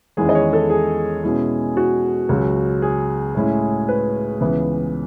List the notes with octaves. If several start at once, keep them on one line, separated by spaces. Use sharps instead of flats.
E2 D#3 G#3 C#4 E4 G#4
D#5
C#5
A4
G#4
B2 G#3 C#4 E4
F#4
C#2 C#3 F#3
G#4
A2 G#3 C#4 E4
B4
C#2 C#3 E3 B3